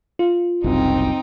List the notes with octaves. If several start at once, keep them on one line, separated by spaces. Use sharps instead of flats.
F4
F#1 C2 C4 D#4 G5